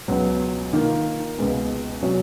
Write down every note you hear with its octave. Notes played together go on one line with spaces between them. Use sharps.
C#2 B2 F#3 B3
D#3 A#3 F4
C#2 B2 G#3 B3
B2 F#3 C#4 F#4 C#5